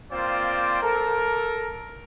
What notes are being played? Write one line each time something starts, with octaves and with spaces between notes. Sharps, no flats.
A#3 C4 F4 C5 D5 G5
A4 A#4